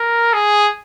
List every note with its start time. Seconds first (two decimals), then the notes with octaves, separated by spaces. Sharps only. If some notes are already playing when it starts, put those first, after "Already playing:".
Already playing: A#4
0.33 G#4